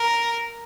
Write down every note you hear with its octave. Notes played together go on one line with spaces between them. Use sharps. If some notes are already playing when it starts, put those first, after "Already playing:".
Already playing: A#4